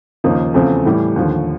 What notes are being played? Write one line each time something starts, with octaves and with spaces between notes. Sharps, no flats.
D#2 C#3 F3 A#3 D#4
E2 C#3 F3 A3 C4
A2 E3 G3
D#2 D3 F3